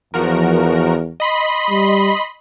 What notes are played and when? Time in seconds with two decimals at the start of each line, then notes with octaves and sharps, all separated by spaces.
0.14 E2 F3 F#4 A#4
1.20 D#5 B5 C6
1.70 G3